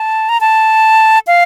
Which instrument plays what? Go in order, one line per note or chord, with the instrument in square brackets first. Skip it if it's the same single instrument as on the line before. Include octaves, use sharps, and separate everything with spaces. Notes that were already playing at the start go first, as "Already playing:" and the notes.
Already playing: [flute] A5
A#5
A5
F5